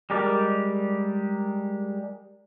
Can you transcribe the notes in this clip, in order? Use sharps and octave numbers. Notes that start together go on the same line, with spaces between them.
G3 G#3 G4 A#4 D5